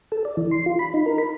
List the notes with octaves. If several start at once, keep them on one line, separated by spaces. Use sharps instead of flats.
A4
D5
E3
C6
F4
B5
D#4
A#4
B5